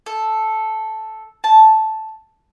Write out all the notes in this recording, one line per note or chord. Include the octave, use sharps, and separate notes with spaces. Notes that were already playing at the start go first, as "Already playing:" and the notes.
A4
A5